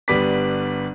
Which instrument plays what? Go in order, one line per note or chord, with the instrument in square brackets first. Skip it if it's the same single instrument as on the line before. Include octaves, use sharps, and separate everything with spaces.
[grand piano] G1 G3 B3 B4 D6 B6